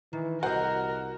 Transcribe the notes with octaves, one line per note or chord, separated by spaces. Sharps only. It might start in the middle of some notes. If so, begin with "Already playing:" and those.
D#3 E3
C2 F#4 A#4 C5 D#5